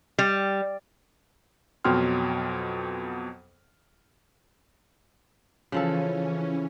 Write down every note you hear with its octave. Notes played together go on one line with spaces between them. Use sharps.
G3
F2 B2 F#3 G5 C6 F6
C#3 E3 F3 C#4 A4